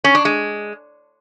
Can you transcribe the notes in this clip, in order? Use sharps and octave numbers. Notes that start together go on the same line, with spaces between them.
C#4
D4
G#3